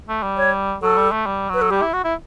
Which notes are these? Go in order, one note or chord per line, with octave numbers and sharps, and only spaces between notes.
A3
G3
C#5
F#3 A4
G3
A3
G3
F#3 B4
A4
G3 G4
E4
F#4
E4